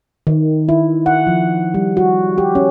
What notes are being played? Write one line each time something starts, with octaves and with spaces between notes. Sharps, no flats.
D#3
E4
F#5
F3
G3
F#4
G4
C#4